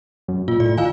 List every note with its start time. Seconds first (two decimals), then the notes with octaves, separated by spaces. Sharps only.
0.28 F#2
0.48 A#2 F4
0.60 A2 D5
0.78 D#3 F4 F5 G#5